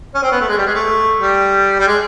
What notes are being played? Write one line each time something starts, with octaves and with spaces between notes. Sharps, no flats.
C#4
C4
B3
A3
G#3
G3
G#3
A3
G3
G3
G#3